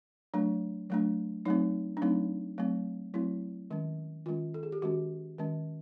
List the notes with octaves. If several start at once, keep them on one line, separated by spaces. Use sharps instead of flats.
F#3 A3 D4
F#3 A3 D4
F#3 A3 C4 D#4
D4
F#3 A3 C4 D#4
F#3 A3 C4
F#3 A3 C4 E4
D#3 G#3 C#4
D#3 G#3 C#4 F4
A4
G#4
G4
D#3 G#3 C#4 F#4
D#3 G#3 C#4